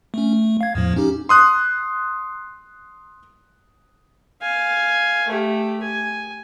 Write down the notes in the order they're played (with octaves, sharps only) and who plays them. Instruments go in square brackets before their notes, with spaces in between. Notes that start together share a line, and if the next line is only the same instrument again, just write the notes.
[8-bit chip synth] A3 C#4
A3
F5 G#6
E2 A2 F3
C#4 D#4 G4
[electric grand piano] C6 D#6 F#6
[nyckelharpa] F5 G#5
A3 G4
G#5